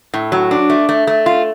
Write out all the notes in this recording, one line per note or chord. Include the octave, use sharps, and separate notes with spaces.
A2
F#3
D4
A3
A3
A3
F4